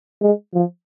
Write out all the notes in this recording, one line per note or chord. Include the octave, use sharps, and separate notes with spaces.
G#3
F3